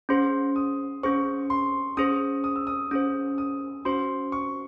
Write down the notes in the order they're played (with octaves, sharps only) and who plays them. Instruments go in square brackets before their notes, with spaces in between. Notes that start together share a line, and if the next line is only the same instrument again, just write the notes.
[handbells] C#4 G#4 C5 [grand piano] C6
[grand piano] D#6
[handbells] C#4 G#4 C5 [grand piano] C#6
[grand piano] C6
[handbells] C#4 G#4 C5 [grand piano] D#6
[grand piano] D#6
E6
D#6
[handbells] C#4 G#4 C5 [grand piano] D#6
[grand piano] D#6
[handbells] C#4 F#4 C5 [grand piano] C6
[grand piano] C#6